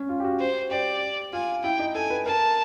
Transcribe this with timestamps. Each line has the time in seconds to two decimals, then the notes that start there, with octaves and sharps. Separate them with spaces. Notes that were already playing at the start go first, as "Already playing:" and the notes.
Already playing: C#4
0.09 F4
0.20 G4
0.24 F#4
0.40 C5
0.71 G4 D5
1.33 F4 G#5
1.63 E4 G5
1.79 D#4
1.95 A4 G#5
2.10 B4
2.26 A#4 A5